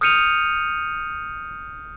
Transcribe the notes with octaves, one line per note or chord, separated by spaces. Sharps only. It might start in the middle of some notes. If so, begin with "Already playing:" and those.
D#6 F6 G6 C#7 D#7 F7